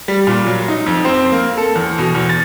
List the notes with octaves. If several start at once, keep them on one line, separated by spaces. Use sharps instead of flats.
G3
A#2
F#3
D#4
F2
C4
A#3
A4
E2
B2
E2
A6